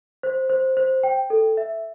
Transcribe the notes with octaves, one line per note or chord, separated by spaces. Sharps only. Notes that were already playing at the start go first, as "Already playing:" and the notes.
C5
C5
C5
G5
A4
E5